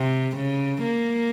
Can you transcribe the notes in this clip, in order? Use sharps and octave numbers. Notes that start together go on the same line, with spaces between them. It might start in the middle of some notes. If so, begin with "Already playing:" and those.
Already playing: C3
C#3
A#3